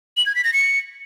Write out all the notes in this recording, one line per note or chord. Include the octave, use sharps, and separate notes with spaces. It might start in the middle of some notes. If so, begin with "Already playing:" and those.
F#7
G#6
B6
A#6
C#7